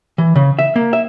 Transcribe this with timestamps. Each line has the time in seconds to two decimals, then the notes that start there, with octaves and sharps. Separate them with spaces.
0.18 E3
0.36 C#3
0.59 E5
0.76 A#3
0.93 E5